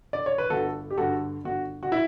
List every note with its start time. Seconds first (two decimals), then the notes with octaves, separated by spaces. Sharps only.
0.13 D5
0.26 C#5
0.38 B4
0.50 G1 F#4 A4
0.90 G4
0.97 G2 D3 F#4 A4
1.44 G1 F#4
1.83 F#4
1.92 E4